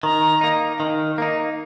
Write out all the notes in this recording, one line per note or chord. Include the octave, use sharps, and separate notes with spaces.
D#3 A#5
A#3 D#4
D#3
A#3 D#4